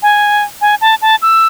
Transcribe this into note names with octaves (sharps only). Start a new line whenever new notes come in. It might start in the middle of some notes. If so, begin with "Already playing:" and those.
G#5
G#5
A5
A5
E6